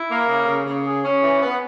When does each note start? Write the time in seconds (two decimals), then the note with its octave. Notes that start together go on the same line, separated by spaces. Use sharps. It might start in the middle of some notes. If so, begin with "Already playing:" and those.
Already playing: E4
0.09 A#3
0.28 C#3
0.47 C#3
0.65 C#3
0.85 G#4
1.03 C#4
1.22 E3
1.41 B3